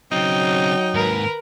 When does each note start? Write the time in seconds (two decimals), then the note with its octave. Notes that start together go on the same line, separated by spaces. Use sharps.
0.12 C#3 F#3 C4 D#4 G5
0.94 D#2 G#2 A#4 B4